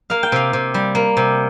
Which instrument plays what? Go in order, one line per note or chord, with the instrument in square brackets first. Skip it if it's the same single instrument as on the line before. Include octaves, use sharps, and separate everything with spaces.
[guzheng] A#3 F5
G5
C3 F5
C3
G3
A#3
C3